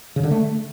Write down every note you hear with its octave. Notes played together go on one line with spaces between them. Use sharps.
C#3
D3
A3